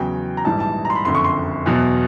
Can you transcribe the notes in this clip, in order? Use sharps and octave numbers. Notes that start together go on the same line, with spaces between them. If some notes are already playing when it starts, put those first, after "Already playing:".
Already playing: E2 C#3 F#3 G5
A#5
A#1 G#2 E3 G3 A5
A5
A#5
C6
B5
F#1 F2 D3 C6
C#6
C6
E2 B2 F#3